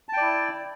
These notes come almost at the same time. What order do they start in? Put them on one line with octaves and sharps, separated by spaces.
A5 G5 D5 E4